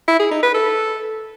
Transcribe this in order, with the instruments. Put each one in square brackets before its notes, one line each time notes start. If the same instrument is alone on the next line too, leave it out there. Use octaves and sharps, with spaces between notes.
[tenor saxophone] E4
G#4
D#4
B4
A4